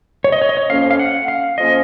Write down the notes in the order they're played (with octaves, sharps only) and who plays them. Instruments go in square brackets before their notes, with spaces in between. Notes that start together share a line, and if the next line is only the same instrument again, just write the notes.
[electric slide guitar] C#5
D#5
C#5
D#5
C#5
[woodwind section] F2 F3 A#3 C#4 [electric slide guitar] F5
[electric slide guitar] F5
F#5
F5
[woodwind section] F2 F3 A#3 C#4 [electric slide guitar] D#5